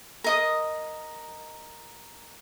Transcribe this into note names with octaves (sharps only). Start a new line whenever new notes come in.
A#4 D#5 D#6